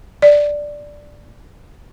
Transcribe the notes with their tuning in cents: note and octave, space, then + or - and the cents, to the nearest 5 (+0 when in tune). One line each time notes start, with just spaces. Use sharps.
D5 +0